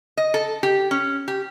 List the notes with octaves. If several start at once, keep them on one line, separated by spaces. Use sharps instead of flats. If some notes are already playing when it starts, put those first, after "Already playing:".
D#5
A4
G4
C#4
G4